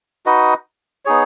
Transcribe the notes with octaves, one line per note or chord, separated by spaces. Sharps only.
D#4 F#4 B4 D#5
B3 D#4 G#4 C#5